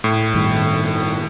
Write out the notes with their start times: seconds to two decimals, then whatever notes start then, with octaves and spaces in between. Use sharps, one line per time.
0.04 A2
0.34 G2 D#3